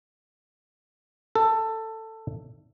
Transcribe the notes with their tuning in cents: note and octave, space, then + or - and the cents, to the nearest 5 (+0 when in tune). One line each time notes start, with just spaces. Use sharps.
A4 +15